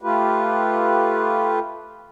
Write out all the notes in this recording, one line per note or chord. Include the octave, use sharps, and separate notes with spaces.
A3 F4 G4 B4